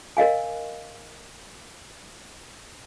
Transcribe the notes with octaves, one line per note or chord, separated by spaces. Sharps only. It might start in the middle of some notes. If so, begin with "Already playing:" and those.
A#4 D#5 F5 G#5